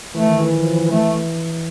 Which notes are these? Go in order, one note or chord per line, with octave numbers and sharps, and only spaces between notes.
E3 A3
D#3
E3
F3
F3
E3
E3 A3